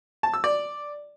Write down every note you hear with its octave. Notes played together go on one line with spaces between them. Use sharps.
A5
E6
D5